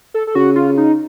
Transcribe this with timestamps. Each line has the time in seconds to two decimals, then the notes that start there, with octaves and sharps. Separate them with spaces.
0.14 A4
0.27 A4
0.35 C#3 F#4
0.56 F4
0.77 D#4